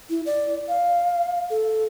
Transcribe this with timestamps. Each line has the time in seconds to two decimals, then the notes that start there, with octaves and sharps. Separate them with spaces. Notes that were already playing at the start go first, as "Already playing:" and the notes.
0.10 E4
0.26 D5
0.69 F5
1.50 A4